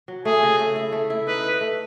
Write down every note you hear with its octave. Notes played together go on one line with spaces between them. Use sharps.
F#3
A3 G#4
C#3
A3
E4
A3
E4
D#4 B4
D#4
A3